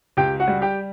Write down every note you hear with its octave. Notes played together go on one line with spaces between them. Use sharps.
C#2 G4 G5
F#4 F#5
G3
G4 G5